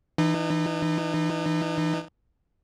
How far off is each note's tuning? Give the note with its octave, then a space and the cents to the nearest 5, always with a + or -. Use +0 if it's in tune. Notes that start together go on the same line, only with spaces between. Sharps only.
E3 +0 D#4 -35